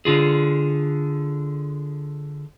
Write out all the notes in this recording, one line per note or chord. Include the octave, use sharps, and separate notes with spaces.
D3 F4 G#4